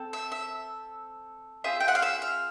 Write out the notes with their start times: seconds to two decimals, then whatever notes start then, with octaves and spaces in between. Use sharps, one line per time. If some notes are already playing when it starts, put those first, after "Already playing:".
Already playing: C4 A4
0.13 E5
0.32 E5
1.64 C4 F4 G#4 E5
1.80 G5
1.88 F#5
1.95 F5
2.02 E5
2.22 F5